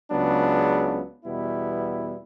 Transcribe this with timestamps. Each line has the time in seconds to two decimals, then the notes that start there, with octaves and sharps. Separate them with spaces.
0.11 C#2 C#3 F#3 B3 D4
1.25 E2 B2 G3 B3 E4